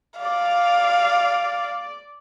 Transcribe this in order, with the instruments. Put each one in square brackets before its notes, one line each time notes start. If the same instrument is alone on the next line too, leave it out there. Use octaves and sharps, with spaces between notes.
[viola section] D5 [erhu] F5